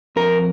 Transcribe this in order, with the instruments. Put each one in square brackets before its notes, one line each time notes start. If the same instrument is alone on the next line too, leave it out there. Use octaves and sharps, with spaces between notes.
[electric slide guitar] F2 A#4